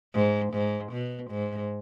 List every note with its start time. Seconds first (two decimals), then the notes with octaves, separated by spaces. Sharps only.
0.14 G#2
0.53 G#2
0.92 B2
1.30 G#2